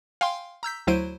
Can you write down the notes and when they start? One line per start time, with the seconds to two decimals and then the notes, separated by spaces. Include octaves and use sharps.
0.21 F5 G5 G#5 C6
0.63 A#5 E6 G6 B6
0.87 D2 F#3 E4 C5 D7 D#7